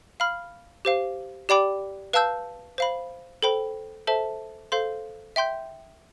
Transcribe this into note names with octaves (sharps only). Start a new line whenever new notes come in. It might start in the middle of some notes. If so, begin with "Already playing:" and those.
F5 B5 F6
G4 C5 F5
G4 D5 G5 B5 D6
B4 F5 A5 E6 G6
C5 F5 B5
A4 C5 G5 B5
A4 C5 E5 A5
A4 C5 F5 C6 G6
E5 G5 C6 G6